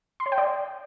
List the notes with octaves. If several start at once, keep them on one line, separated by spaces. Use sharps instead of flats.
C6
C#5
G5
D5